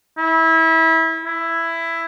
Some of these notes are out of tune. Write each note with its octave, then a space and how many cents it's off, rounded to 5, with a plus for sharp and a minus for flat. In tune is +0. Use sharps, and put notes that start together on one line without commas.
E4 -25
E4 +10